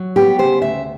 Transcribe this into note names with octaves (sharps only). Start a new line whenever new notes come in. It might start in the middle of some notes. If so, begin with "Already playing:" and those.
Already playing: F#3
B3 G4
C#3 C5
D2 E5